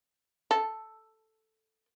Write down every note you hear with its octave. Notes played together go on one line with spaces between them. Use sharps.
A4